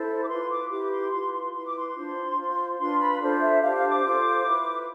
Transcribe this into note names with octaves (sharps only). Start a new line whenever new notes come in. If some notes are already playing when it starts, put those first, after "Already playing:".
Already playing: E4 A4 C5
D6
F4 B4 C6
D6
E4 G4 B4 D6
C6
F4 B4 C6
C6
E4 B4 C6
D6
C6
D4 F4 C5
F4 C5
D4 F4 B4 C6
B5
D4 F4 A4 C5
E5
D4 G4 C5 F5
F5
D6
F4 A4 C5
E4 B4